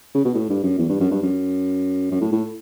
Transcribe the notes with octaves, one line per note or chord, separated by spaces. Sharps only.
C#3
B2
A2
G2
F#2
E2
G2
F#2
G2
F#2
F#2
A2
A2